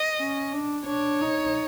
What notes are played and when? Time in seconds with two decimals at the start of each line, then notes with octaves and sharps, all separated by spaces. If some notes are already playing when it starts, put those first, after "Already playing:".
Already playing: D#5
0.18 C#4
0.52 D4
0.86 D4 C#5
1.21 D#4